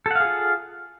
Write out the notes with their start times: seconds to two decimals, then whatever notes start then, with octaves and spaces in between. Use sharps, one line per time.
0.06 A4
0.11 F#5
0.15 F5
0.20 G#4
0.25 F4